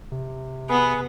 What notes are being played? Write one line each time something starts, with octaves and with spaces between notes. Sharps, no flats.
C3
B3 G#4 B4